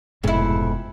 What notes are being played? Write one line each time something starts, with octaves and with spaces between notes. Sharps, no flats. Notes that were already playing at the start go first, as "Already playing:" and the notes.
F1 F2 G#2 B2 G#3 E4